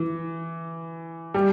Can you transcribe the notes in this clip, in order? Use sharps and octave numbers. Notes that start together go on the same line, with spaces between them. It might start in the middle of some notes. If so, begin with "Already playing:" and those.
Already playing: E3
G3